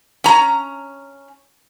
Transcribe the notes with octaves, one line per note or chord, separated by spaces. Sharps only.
C#4 A#5